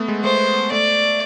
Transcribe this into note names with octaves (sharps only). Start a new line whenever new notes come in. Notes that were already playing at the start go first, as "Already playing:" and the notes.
Already playing: A3 B3
G#3
A3 C5
A3 D5